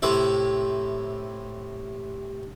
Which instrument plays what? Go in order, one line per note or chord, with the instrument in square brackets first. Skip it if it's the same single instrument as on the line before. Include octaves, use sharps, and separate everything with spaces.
[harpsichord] A2 C3 E4